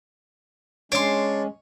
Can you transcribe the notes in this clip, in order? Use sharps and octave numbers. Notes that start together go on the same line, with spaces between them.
G#3 C#4 D4 C#5 C6